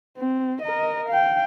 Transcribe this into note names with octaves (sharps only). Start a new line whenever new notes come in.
C4
A#4 D#5
F5 G5